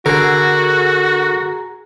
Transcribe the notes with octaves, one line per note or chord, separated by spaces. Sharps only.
D3 F#4 G#4 A#4